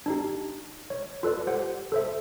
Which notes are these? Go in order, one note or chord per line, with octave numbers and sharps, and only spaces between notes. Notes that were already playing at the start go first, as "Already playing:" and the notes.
D4 D#4 G4
C#5
F4 A4 B4 D5
G4 C5 F#5
A4 C5 E5